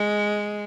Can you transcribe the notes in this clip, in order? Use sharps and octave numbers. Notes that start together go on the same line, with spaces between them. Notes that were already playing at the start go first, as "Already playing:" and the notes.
Already playing: G#3